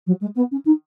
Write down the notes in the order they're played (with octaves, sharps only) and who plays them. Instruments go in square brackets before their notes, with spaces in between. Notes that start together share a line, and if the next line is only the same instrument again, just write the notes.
[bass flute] F#3
G#3
B3
C#4
D#4